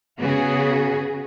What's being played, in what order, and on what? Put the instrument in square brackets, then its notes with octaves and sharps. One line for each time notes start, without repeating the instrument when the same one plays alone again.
[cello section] C#3 B3 F#4 G#4